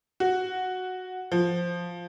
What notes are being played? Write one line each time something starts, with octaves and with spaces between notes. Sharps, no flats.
F#4
F3